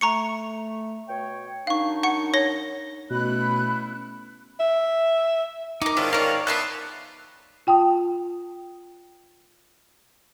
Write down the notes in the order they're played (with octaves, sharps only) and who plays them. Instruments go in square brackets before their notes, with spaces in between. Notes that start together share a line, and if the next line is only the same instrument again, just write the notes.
[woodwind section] A3 [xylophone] A#5 C#6 C#7
[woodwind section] B2 C#5 G5
[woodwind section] F#2 D4 D#4 [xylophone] F5 C#6
[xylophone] F#5 C#6 C#7
C#5 A#6 G7
[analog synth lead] B2 [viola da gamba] A3 C#4 E4 [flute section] B5 F#6
[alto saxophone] E5
[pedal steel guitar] D#4 [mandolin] A#4 D6
[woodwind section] G#2 D#3 [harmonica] C#4 D4 F4 [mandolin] E4
[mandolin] A#4 C#5 [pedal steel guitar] D5 F5
[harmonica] B3 B4 E5 [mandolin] D#5 A5 C6 [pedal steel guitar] F#6
[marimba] F4 G5 A5 D#6